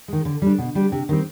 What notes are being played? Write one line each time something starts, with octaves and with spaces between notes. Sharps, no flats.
D#3 G#3
D3
G3 D4
B2
G3 D4 G4
C3
D#3 G3 C4